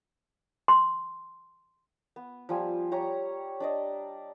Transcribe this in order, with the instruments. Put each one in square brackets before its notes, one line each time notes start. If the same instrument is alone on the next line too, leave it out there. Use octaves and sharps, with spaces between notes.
[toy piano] C6
[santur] B3
F3 G3 G#5
G4 C#5 A#5 C#6
D4 D5 D#5